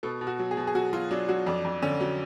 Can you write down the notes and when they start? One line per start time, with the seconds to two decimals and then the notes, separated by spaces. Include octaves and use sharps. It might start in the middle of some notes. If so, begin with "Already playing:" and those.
0.03 B2 A4
0.21 B2
0.27 F#4
0.39 F#3
0.51 G#4
0.57 B2
0.67 G#4
0.75 F#3 F#4
0.93 F#3 F4
1.11 F#3 D4
1.29 F#3 F#4
1.47 F2 D4
1.64 F2
1.82 D3 C#4
2.00 F#3